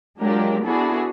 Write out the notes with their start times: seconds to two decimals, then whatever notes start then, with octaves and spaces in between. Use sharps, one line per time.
0.21 F#3 G#3 D4 F4 G4 A#4
0.64 B3 D4 E4 F#4 G#4 A4